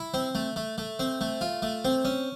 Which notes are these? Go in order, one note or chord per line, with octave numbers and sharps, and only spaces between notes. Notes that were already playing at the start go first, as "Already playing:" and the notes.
Already playing: E4
C4
A3
A3
A3
C4
A3
F4
A3
C4
C#4